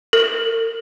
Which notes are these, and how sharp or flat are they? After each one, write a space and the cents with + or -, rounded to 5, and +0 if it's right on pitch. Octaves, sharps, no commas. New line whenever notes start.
A#4 -40